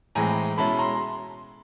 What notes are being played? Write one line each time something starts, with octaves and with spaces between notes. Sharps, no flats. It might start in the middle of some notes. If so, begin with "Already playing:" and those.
A2 E3 G#3 C4 G#5 A#5
B2 G#3 C#4 E4 A5 B5
A#5 C6